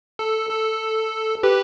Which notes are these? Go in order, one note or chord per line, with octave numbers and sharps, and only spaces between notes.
A4
A4
G4 B4